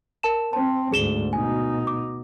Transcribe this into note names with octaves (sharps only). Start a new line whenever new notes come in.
A#4 A5 E7
C4 A5
D2 G#2 G#4 E7 G7
B2 D#4 G#5
D6